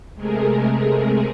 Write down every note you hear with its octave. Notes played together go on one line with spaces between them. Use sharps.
C3 G#3 A3 G#4 A#4